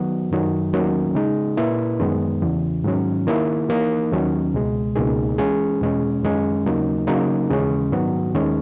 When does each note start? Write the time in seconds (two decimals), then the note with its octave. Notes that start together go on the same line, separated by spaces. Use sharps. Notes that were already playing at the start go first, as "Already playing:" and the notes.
Already playing: D#3 F#3 B3 F#4
0.31 F#2 D#3 F#3
0.73 E2 D#3 F#3 A#3 C#4
1.15 C#3 G#3 D#4 G#4
1.57 A#2 A#3 E4 B4
2.00 F#2 D#3 G#3 B3
2.42 E2 C#3 E3
2.84 G#2 D#3 F#3 C#4
3.27 D#3 A#3 E4
3.69 E3 A#3 D#4
4.12 D#2 D#3 F#3 C#4
4.54 C#2 B2 G#3
4.96 C#2 B2 A#3 D#4 G#4
5.38 E3 G#3 C#4 G#4
5.81 E2 B2 G#3 C#4
6.23 F#2 D#3 G#3 C#4 G#4
6.65 D#2 C#3 F#3 A#3 D#4
7.07 C#3 F#3 A#3 D#4 A#4
7.49 D#2 C#3 E3 G#3 C#4
7.92 G#2 D#3 F#3 B3 F#4
8.34 D#2 D#3 G#3 C#4